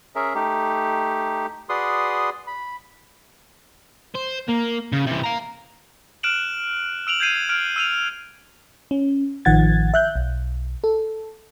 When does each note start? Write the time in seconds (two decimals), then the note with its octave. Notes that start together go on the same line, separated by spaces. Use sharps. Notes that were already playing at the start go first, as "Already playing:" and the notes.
0.15 C#4 G#4 A#4 E5
0.35 A3 D#4 G4
1.69 F#4 G#4 B4 D5 C6 D#6
2.47 B5
4.15 C5
4.49 A#3
4.93 C#3
5.07 C3 E3
5.24 F5 A#5
6.23 F6 F#6 D7 E7 F#7
7.07 E6 D7 F7 F#7
7.20 G6 G#6 C7 D#7 F7
7.49 F6 D7
7.76 E6 D#7 F7
8.91 C#4
9.45 A1 D#3 F3 F#5 G#6 A6
9.94 E5 F#6 G6
10.16 B1
10.84 A4